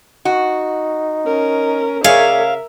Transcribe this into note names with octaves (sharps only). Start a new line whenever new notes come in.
D#4 F#4
C#4 A#4
C#3 G#4 A#4 C#5 D5 E5 F5